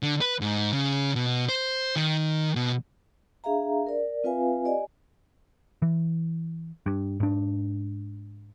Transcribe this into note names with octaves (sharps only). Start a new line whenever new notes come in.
D3
B4
G#2
C#3
B2
C5
D#3
B2
D4 G#4 E5 F5 A#5
A#4 D5
C4 F4 B4 E5 F5 G#5
G4 D5 D#5 G#5
E3
G2
G#2 D4